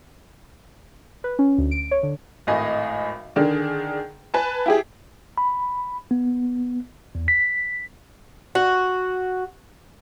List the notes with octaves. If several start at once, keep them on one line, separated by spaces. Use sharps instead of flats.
B4
C#4
D2
D7
C#5
D3
G#1 A2 D#5 G#5
D3 D#3 D4 G#4
B4 G#5 A5
E4 G4 G#4
B5
B3
E2
B6
F#4